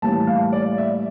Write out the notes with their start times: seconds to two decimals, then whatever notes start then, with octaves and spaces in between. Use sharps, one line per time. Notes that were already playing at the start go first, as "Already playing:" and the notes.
0.02 A2 E3 G3 A#3 A5
0.27 F5
0.53 D5
0.78 E5